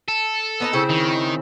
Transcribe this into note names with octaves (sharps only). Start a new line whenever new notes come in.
A4
B3 D#4 A#5
C#3 C4 E4
D#3